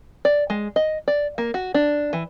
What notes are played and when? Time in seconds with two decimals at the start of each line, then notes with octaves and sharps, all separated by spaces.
0.25 D5
0.50 G#3
0.76 D#5
1.08 D5
1.38 A#3
1.54 F#4
1.74 D4
2.13 E3